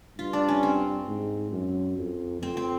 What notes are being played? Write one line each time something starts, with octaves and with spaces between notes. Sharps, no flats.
G2 F4
D4
C#4
C4
G#2
F#2
F2
F2 C4
C4